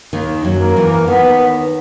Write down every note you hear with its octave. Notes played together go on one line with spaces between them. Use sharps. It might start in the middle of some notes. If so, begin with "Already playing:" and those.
D#2 D#3
F#2 F#3
A#3
E2 E3
D#2 D#3 B3